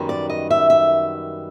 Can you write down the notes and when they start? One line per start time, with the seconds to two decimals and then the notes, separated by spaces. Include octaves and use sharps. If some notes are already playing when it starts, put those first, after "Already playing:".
Already playing: F#2 D#3 G3 B3
0.09 D5
0.30 D#5
0.50 E5
0.70 E5